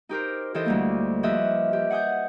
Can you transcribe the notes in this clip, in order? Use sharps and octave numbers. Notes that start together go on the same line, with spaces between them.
D#4 G4 A#4 C5
E3 E4 G4 A4 C5 D#5
D2 G3 A#3
F3 G4 B4 D#5 E5
G4
F#5 G#5 D#6 G6